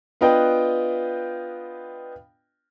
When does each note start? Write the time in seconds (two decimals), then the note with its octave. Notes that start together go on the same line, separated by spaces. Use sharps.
0.21 B3 D4 F4 B4 D#5 G5